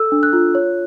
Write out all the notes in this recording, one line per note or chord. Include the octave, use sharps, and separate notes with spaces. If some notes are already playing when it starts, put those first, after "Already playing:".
Already playing: A4 E6
D4
F#6
F4
C#5